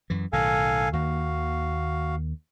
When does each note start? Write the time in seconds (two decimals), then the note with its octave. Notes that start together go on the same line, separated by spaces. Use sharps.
0.10 F#2 E3
0.33 B1 A2 D#3 A4 F5 G#5
0.93 D#2 D#3 A#3 F#4 F5